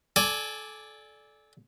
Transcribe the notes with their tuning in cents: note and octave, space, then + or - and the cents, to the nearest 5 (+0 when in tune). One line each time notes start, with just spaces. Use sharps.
A4 -25 D5 +0 G#5 +0